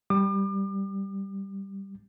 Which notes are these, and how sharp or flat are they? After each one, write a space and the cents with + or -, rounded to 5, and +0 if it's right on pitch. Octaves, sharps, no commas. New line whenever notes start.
G3 +0 D6 +40